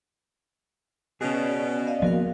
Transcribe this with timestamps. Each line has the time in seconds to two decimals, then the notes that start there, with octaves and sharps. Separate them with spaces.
1.21 B2 C#4 G#4
1.35 D5
1.87 D5 D#5 F5
2.02 F3 A#3 B3 F#4 A#4 F5